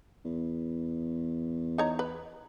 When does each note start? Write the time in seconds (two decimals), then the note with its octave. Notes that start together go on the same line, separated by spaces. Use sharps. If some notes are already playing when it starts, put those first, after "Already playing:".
0.25 E2
1.78 D#4 C#5 A#5
1.99 B4